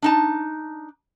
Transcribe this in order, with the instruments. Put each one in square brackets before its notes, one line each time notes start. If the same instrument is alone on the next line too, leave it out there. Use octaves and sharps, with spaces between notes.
[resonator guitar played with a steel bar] D4 D#4 A5